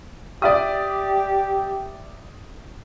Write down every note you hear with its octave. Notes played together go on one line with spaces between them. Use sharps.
G4 D5 E5 D#6